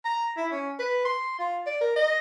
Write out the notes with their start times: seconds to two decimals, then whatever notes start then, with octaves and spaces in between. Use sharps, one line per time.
0.05 A#5
0.37 E4
0.52 C#4
0.79 B4
1.05 C6
1.39 F4
1.66 D5
1.81 A#4
1.95 D#5